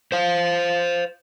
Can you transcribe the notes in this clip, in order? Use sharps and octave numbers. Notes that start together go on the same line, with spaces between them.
C5 F5